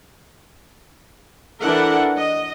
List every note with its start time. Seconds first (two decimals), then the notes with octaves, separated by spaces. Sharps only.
1.61 E3 D4 E4 A4 A#4 F#5
2.16 D#5